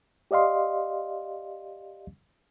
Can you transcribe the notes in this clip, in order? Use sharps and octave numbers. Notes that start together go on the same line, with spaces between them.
G4 D5 D#5 F5 C6